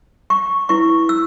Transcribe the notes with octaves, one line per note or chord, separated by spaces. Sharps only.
C#6
E4 B4 C#6
E6